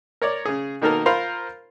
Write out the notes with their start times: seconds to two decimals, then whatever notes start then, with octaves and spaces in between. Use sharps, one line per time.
0.22 A#4 C#5 D5
0.45 C#3 G#4
0.82 B2 D#3 A#3 D#4 A4 A#4
1.06 F4 A#4 C5 F5 B5 C6